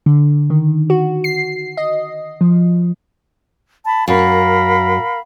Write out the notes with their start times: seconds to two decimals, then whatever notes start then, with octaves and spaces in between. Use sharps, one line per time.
0.06 D3
0.50 D#3
0.90 F#4
1.24 C7
1.77 D#5
2.41 F3
3.86 A5 B5
4.08 F#2 A#4 F5 B5